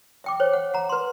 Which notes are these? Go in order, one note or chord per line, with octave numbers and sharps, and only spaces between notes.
E5 G5 D6
C5 C#5
F#5
F#5 A#5
B4 C6